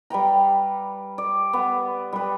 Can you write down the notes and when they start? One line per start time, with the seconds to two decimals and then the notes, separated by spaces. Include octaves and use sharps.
0.10 G3 B4 G5 A#5
1.18 D5
1.53 B3
2.13 G3 B4